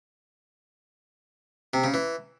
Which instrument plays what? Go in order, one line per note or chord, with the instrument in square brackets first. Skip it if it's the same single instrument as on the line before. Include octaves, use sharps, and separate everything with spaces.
[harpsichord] C3
C#3
E3